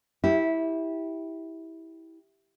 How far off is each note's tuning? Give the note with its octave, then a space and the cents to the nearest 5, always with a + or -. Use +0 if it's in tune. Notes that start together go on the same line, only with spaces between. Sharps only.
E4 -15 G4 +0